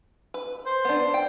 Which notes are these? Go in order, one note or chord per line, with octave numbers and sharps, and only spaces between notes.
B4
C5
B3 D4
G5